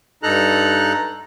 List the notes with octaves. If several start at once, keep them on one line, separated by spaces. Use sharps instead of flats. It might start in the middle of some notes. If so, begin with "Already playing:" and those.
G2 D#4 A4 A#5 F#6